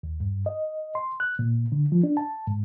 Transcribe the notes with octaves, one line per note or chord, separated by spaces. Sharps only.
D#2
G2
D#5
C6
F#6
A#2
D3
F3
D4
A5
G#2